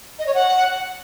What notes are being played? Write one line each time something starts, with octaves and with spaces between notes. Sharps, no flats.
D#5
C#5
F#5